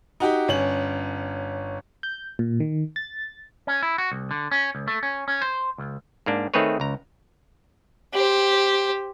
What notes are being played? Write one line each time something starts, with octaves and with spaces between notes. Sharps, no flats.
D#4 F#4 G4
G1 C#4 F#7
G6
A#2
D#3
A6
C#4
E4
F#4
C2
D3
C#4
C#2
A3
C#4
C#4
C5
C#2
G#2 A#3 D4
D#3 A3 C4 G#4 B4 C#5
C#2 A#5
G4 C5